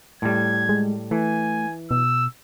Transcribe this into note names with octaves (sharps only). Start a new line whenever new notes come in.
A2 G3 G#6
G#3
E3 A3 G#5
B2 E6